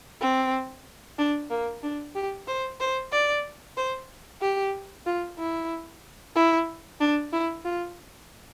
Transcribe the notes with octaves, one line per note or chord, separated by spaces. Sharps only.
C4
D4
A#3
D4
G4
C5
C5
D5
C5
G4
F4
E4
E4
D4
E4
F4